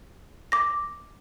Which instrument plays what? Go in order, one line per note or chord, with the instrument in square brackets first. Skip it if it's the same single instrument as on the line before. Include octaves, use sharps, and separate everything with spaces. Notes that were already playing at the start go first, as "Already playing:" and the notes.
[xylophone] D6 A#6